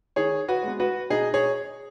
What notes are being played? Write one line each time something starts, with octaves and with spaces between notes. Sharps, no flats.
D#3 G#4 C#5
F#4 B4
G#3 B3
F#4 B4
B2 D#4 G#4
G#4 C#5